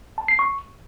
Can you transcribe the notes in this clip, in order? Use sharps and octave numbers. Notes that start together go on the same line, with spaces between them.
A5
C7
C#6